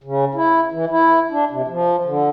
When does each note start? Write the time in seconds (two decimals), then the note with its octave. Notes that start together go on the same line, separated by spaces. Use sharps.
0.04 C#3
0.35 E4
0.72 E3
0.90 E4
1.31 D4
1.50 C3
1.68 F3
2.05 D3